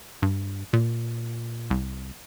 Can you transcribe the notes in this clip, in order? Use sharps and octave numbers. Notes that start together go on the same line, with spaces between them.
G2
A#2
C2